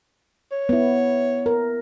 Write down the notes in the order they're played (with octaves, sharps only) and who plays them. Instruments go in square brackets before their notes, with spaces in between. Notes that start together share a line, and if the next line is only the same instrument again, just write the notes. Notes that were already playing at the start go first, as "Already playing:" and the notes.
[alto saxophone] C#5
[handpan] B3 E4
A#4